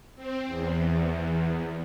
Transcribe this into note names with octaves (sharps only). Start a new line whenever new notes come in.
C4
E2